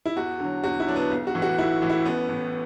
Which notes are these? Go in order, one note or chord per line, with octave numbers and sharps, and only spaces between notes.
E4
E2 F#4
D3 F#3
E2 F#4
E4
D3 F#3 D4
B3
B1
F#4
A2 E3
F#4
B1 E4
A2 E3
E4
A1 B3
A2 E3